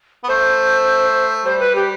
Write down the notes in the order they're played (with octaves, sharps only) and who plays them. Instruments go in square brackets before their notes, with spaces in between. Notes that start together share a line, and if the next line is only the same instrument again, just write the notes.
[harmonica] B3
[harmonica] A3 [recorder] C5
[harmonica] G3 [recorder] C5
[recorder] B4
G4